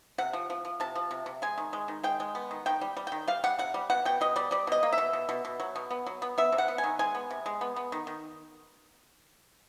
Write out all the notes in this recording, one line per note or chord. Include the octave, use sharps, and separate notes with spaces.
C3 F#5
F3
F3
F3
C3 A5
F3
C3
C3
G#3 G#5
D#3
G#3
D#3
G#3 G5
G#3
B3
D#3
D#3 G5
G3
G3
D#3 G5
G3 F5
G3 F#5
C3 F#5
G3
B2 F#5
B2 G5
B2 D#5
G3 D5
G3 D5
B2 D#5
A#3
E5
B2
B2
B2
B2
F#3
B2
B3
F#3
B3
B3 E5
C3
F#5
B3
G#5
D#3
G#3 G#5
B3
C3
G#3
B3
B3
D#3
D#3